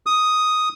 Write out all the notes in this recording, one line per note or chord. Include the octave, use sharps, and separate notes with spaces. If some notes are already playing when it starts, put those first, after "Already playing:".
D#6